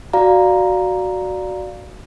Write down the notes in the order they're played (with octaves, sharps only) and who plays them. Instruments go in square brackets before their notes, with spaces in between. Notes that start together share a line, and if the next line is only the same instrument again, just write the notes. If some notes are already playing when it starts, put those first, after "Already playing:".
[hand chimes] F#4 D5 F5 A#5